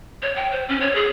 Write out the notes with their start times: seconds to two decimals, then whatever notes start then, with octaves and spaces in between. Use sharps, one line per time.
0.22 C#5
0.36 G5
0.52 C5
0.69 C#4
0.81 C#5
0.96 G#4